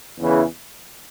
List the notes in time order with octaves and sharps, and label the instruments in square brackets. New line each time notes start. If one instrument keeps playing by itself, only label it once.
[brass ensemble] E2 C#3 E3